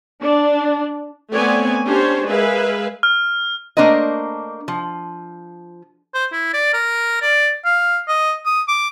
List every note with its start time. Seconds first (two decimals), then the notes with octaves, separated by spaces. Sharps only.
0.22 D4
1.31 A3 B3 C4 C#5 D5 G#5
1.86 C#4 D4 G4 C5 C#5
2.27 G#3 G#4 A#4 B4 E5 F5
3.03 F6
3.77 A3 A#3 D4 A#4 C5 D#5
4.68 F3
6.14 C5
6.32 E4
6.53 D5
6.73 A#4
7.22 D5
7.65 F5
8.08 D#5
8.45 D#6
8.68 D6